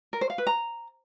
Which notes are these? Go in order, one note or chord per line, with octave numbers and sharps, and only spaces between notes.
A#4
C5
F5
B4
A#5